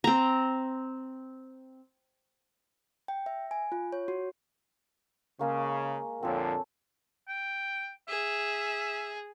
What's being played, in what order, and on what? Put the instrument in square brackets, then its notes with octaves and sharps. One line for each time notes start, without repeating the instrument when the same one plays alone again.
[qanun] C4 A#5
[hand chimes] G5
E5
G#5
F4
C#5
F#4
[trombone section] C#3 [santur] G#3 A#3 C#6
[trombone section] F2 A#2 D3 [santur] C4 A4 C#5
[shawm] G5
[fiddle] G#4 [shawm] E5